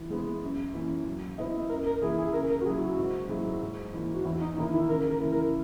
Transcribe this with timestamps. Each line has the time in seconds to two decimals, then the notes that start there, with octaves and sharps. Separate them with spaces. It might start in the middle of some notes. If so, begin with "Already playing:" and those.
Already playing: E3
0.10 G#3 B3
0.42 F#2
0.74 E3 A#3 C#4
1.06 F#3
1.38 B3 E4 B4 D#5
1.69 F#2 A#4
1.86 A#4
2.02 E3 A#3 E4 G#4
2.18 G#4
2.33 C#3 A#4
2.49 A#4
2.61 F#4
2.65 F#3 A#3 E4 G#4
2.81 F#4
2.98 G#2
3.29 F#3 A#3 E4 G#4
3.61 G#2
3.93 E3 A#3
4.14 F#4
4.25 E2 E4
4.41 D#4
4.57 D#3 A#3 D#4 E4 A#4
4.73 E4
4.89 C#3 A#4
5.10 A#4
5.20 E3 A#3 E4
5.32 A#4